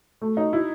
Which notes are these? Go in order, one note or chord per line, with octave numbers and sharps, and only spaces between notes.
A3
D#4
E4